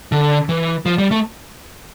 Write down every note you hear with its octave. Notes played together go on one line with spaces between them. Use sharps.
D3
E3
F3
G3
A3